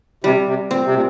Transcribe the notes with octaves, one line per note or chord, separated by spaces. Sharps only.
C3 G3
C3
A#2 C4
C3
A#2